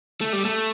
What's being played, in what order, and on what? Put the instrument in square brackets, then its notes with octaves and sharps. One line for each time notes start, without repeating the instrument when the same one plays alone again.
[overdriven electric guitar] A3
G3
A3